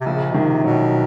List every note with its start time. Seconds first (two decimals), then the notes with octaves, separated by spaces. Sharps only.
0.01 C3
0.06 A#1 C#3
0.30 B2
0.34 C3 D#3
0.64 B2 F#3